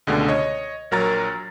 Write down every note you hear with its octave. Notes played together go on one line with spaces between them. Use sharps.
C#2 B2 D3 G#3 A3
C#5 D#5
A#1 F#3 A#4 C#5 A#5 A6